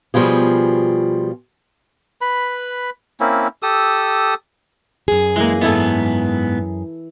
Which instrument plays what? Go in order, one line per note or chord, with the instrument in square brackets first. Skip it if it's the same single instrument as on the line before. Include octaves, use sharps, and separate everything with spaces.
[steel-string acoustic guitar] B2 F3 G3 F4 G#4
[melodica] B4 B5
A#3 C4 C#4 E4
G4 A4 D#6 E6
[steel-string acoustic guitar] F#2 G#4
[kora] E3 A#3 [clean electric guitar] G#3
[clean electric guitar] G#2 B3 [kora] E3 E4 A4